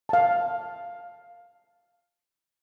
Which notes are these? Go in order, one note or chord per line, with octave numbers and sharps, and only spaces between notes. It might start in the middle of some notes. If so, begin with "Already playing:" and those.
F5 A5